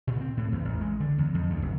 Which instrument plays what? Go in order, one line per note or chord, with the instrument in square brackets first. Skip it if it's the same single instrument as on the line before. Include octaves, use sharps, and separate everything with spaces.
[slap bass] A#2
C4
A2
E2
A1
G#3
D3
E2
F2
D2
F#1